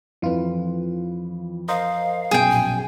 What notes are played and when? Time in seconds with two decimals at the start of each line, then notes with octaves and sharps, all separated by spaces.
0.22 F2 E3 F4 B4
1.68 A#4 C5 D#5 F5
2.31 F#2 B2 G#4 G5
2.51 A#1 G#5